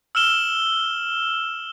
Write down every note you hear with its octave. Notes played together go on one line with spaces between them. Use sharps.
E6 F6 E7 G7